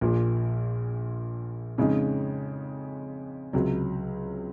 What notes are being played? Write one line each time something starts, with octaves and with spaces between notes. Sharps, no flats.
A#1 A#2 F3
F2 C#3 G#3 D#4
C#2 C3 F#3